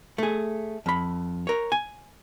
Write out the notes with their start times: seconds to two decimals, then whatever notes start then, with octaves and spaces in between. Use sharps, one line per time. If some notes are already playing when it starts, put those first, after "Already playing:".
0.18 A3 G#4
0.86 F2 B5
1.47 A#4 C#5
1.72 G#5